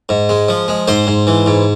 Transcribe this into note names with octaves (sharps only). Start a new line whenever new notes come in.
G#2
G#3
F3
G#3
G#2 C5
G#2
E3
G#2